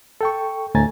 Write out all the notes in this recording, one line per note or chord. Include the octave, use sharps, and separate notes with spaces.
A4 G5 C#6
D2 A2 A3 G#5 A#5 A6